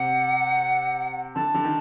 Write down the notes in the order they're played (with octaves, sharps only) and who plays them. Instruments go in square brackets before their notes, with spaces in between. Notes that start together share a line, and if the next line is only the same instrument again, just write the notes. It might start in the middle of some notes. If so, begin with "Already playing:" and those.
Already playing: [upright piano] C3 [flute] F#5
[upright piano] D3 [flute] A5
[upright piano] D3
D#3